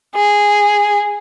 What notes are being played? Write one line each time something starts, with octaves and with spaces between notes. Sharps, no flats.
G#4